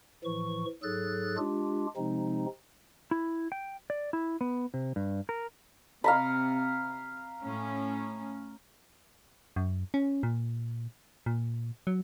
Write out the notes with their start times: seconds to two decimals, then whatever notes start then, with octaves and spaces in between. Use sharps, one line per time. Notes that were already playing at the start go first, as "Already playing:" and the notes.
0.24 A2 E3 F3 C#6
0.83 G#2 F#3 G#4 A4 F#6 A6
1.37 G#3 D4 F4 G4
1.97 C3 F3 G#3 C4 D#4
3.11 E4
3.52 G5
3.90 D5
4.13 E4
4.41 B3
4.74 C3
4.96 G2
5.29 A#4
6.04 C3 F5 A#5 B5
7.42 A2 C#4
9.56 F#2
9.94 C#4
10.23 A#2
11.26 A#2
11.87 F#3